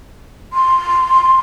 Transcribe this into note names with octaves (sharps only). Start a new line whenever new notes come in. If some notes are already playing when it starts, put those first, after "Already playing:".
C6